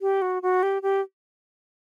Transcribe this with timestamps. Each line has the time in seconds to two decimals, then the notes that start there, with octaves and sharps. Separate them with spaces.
0.01 G4
0.22 F#4
0.42 F#4
0.63 G4
0.82 G4